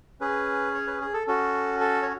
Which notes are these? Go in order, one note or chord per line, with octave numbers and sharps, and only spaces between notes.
C#4 G#4 B4
C#5
B4
G#4
A4
C#4 F#4 A4
A4
C#5